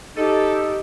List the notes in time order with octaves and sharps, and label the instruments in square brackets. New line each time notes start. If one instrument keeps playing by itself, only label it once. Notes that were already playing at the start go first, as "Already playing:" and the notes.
[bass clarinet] D#4 [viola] G4 [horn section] A4 [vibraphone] D#5